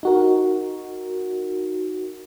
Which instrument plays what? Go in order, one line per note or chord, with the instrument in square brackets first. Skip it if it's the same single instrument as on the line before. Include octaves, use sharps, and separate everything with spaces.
[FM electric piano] D#4 F#4 A#4